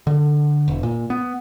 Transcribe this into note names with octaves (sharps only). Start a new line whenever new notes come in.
D3
E1
A#2
B3